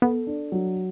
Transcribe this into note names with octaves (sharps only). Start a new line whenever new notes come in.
B3 A4
D4
F#3